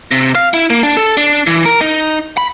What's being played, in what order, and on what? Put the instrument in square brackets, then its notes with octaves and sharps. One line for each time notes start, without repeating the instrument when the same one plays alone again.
[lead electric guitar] C3
F5
E4
A#3
D4
A4
D4
E3
A#4
D#4
B5